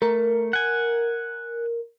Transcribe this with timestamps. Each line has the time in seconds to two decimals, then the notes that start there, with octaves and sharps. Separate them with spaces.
0.02 A3 A#4
0.53 F#5 G#5